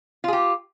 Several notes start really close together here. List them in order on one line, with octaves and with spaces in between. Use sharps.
F4 G#4 G4